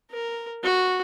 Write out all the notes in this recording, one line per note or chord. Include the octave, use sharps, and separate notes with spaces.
A#4
F#4